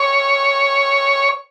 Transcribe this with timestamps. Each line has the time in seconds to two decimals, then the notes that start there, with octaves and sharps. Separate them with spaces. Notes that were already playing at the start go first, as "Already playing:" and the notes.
Already playing: C#5